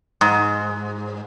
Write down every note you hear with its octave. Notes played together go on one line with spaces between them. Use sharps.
G#2